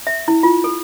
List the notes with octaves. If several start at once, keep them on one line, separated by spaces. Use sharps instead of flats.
E5
E4
F4
A4